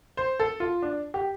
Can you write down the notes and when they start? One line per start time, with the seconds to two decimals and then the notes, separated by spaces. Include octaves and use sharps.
0.17 C5
0.40 A4
0.60 F4
0.82 D4
1.14 G4